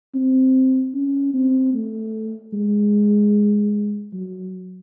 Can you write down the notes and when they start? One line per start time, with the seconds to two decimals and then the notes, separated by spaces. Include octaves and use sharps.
0.14 C4
0.94 C#4
1.34 C4
1.74 A3
2.53 G#3
4.13 F#3